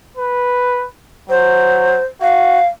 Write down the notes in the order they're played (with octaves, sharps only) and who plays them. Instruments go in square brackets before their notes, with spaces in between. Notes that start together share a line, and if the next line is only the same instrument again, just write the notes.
[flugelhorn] B4
[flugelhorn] F#3 [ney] C5
[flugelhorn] F#4 [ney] F5